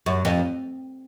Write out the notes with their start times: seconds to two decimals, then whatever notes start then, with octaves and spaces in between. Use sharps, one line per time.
0.06 F#2
0.25 F2